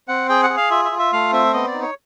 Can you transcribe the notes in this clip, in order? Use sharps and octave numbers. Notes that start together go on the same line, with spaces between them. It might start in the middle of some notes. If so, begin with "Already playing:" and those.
C4 F#5
G#4 G5
F#5
G#4
F5
F4 E5
E5
F4
E5
A3 F5
C4 E5
B3 D#5
D5
D#4
C#5